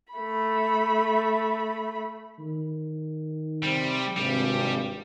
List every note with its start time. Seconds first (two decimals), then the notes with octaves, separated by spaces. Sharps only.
0.14 A3 B5
2.39 D#3
3.63 C3 G3 C4
4.17 G#1 G2 C3 G3